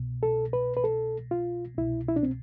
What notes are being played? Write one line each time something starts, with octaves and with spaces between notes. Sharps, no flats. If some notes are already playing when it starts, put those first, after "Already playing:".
Already playing: C2 B2
A4
B4
B4
A4
F4
C2 B2 E4
E4
D4
C4